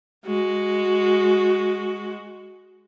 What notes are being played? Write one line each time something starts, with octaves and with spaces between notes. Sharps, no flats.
G#3 F#4